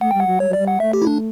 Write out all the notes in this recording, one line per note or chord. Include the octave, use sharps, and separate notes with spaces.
A3 F#5
G3 G5
F#5
F#3
G3 C#5
F#3
G3 D5
F#5
A3 E5
G4
E4
D4